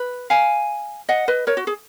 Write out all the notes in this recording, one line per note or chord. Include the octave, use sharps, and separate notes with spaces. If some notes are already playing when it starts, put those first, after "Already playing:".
Already playing: B4
F5 G#5
D#5 F#5
B4 D#5
A#4 C#5
F#4
G#4